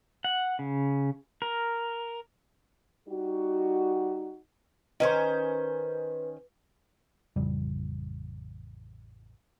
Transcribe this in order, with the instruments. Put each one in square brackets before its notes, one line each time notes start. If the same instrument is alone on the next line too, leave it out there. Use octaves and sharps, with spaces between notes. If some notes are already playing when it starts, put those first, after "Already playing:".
[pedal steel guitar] F#5
C#3
A#4
[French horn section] G3 D#4 F#4
[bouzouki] D#3 C#4 C5 [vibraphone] B4 [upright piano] D#5
[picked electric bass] A1 F2 C#3 G3